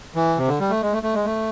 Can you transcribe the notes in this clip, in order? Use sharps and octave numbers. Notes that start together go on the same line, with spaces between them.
E3
C3
D3
G3
A3
G#3
A3
A3
G#3
A3